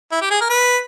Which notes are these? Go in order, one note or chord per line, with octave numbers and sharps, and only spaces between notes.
E4
G4
G#4
A#4
B4